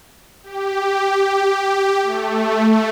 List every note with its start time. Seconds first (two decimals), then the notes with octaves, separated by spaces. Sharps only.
0.43 G4
2.03 A3